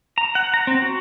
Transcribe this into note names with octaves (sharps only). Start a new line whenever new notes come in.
A#5
F#5
A#5
C4
F#4